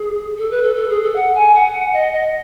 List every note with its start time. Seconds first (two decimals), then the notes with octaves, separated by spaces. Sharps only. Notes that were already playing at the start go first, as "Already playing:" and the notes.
Already playing: G#4
0.38 A4
0.51 B4
0.63 A4
0.76 A4
0.89 G#4
1.03 A4
1.16 F#5
1.35 G#5
1.54 F#5
1.93 D#5
2.13 D#5